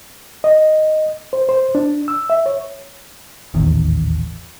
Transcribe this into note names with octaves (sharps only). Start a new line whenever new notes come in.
D#5
C5
C5
D4
E6
E5
C#5
D#1 A1 E2 D#3